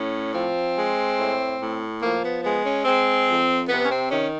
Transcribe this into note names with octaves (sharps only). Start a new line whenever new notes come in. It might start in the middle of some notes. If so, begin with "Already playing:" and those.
Already playing: A2 C#4
F3 C4
G#3
A2
A2
F3 A#3
B3
G#3 B3
C#4
G#3 C4
F2
C3 B3
C#4
C4
D#3 C#4